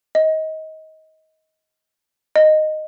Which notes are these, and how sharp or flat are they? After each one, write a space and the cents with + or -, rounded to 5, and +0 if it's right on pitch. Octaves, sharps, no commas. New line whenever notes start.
D#5 +25
D#5 -10